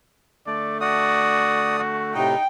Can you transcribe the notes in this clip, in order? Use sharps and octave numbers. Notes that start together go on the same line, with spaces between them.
D3 A3 D5
F#4 D5 D#6
F#4
A2 C3 D#4 G5